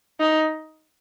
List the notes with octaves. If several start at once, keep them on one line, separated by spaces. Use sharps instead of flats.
D#4